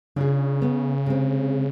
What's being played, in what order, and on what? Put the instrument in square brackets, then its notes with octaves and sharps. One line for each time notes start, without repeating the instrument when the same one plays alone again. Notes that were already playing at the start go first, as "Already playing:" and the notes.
[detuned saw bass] C#3 [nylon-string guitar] D4 F4 G#4
[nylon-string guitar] A3 B3
C3 G#3 C4